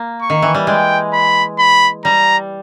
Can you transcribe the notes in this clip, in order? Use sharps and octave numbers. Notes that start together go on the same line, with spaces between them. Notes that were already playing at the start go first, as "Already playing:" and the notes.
Already playing: A#3
C#6
D#3
E3
G3
G#3 G5
B5
B5
G3 A#5